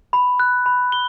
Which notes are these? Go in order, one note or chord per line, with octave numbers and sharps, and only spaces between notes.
B5
F#6
B5
G7